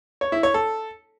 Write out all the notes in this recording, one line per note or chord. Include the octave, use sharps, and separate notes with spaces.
C#5
E4
C#5
A4